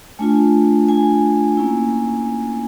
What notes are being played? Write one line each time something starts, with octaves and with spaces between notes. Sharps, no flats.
A3 D4 F4 G#5
G#5
A#3 C#4 E4